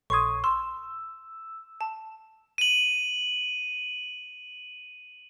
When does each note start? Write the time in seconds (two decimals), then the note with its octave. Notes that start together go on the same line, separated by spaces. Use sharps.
0.10 A#1 C6 C#6 D#6 G#6
0.44 C6 E6
1.81 A5
2.58 D#7 F#7